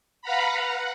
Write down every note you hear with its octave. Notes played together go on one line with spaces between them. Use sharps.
B4 F5 F#5 A#5 B5
F#5